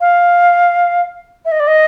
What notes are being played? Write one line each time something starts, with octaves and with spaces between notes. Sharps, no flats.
F5
E5
D#5
D5
D#5